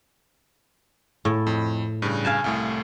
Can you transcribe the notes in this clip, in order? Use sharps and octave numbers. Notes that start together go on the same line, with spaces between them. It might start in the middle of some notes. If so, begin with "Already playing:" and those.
A2
F2
G2 C#3
F5 G#5 A5
C2 A2 A3